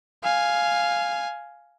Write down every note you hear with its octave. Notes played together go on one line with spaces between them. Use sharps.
F5 G#5